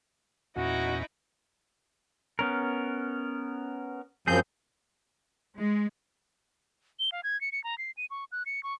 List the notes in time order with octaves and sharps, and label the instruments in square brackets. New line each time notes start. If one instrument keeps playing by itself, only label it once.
[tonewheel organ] E2 A#2 C#4 [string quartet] D#4 E4 [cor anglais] F#4
[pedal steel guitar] B3 C#4 A#4
[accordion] F#2 F3 G6 [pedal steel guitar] C4 G#4
[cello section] G#3
[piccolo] G7
F5
G#6
C#7
C#7
A#5
C7
D#7
C#6
F#6
C#7
C#6